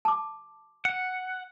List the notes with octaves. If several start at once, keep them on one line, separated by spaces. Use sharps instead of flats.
A5 D6
F#5